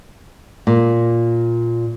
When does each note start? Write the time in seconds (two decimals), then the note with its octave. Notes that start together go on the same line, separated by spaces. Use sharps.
0.67 A#2